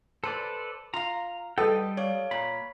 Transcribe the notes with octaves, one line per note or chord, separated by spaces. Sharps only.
A4 B4 C5 D5
F4 F5 A#5
G3 A4 B4 D#5 G5
C#5 D5 F5
A#2 B5